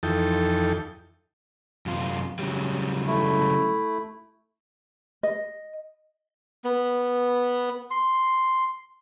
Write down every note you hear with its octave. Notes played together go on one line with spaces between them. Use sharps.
F2 E3 D#4 A4 G5
F#2 C3 F4
C#3 F#3 G3
A3 E4
D#5
B3
C6